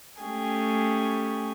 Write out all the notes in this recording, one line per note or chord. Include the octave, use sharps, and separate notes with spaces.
A3 C#4 G4 G#4